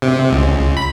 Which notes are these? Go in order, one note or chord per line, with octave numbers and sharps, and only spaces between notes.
C3
C#2
B5